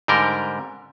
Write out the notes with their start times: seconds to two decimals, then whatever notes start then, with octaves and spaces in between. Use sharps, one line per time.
0.08 G#2 D3 G3 A#4 G5